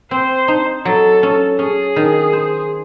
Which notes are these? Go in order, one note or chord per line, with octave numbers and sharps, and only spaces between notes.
C4 C5
D#4
F#3 A4
C#4
C#4 G#4
D#3
C5